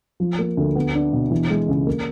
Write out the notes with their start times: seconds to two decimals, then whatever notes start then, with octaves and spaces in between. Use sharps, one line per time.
0.20 F3
0.39 A#3
0.57 D2
0.75 B3
0.94 D4
1.13 B2
1.31 E3
1.50 G#3
1.68 C#2
1.87 A#3